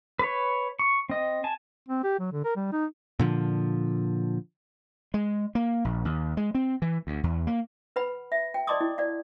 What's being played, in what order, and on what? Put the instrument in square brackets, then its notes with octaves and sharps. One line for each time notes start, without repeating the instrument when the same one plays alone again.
[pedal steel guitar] B4 C#5
C#6
C4 D#5
G#5 A5
[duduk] C4
G4
F#3
D3
A#4
G3
D#4
[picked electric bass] A#2 D3 F3
[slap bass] G#3
A#3
A#1
D#2
G#3
C4
E3
D2
E2
A#3
[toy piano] B4 F#5 B5
E5
G5
D5 D#5 A5 C6 D6 D#6
E4
D5 F5